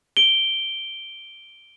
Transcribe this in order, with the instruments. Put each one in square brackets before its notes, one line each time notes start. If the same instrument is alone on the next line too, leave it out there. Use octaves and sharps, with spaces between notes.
[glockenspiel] D7 G7